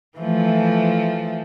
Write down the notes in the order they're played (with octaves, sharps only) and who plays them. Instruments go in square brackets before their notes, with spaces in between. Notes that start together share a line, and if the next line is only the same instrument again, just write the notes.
[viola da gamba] E3 F3 A3